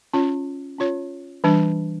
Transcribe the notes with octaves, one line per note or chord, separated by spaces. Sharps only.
C#4 F4 C#5
C#4 F4 C#5
E3 G3 D4